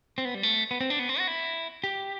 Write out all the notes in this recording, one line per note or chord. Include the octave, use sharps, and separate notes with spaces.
C4
B3
G3
A3
B3
C4
D4
B3
C4
F#4
E4
G4